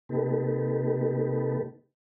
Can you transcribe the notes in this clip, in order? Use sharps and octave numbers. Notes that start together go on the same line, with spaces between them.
C3 A#3 D#4 G4 A4 B4